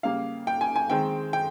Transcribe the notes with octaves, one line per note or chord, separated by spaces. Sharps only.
C#3 G3 A#3 F5
G5
G#5
G#5
D#3 G#3 C4 G5
G5